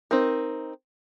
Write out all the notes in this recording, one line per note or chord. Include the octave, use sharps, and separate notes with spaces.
C4 D#4 A#4